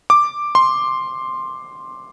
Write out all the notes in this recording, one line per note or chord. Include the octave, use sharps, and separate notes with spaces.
D6
C6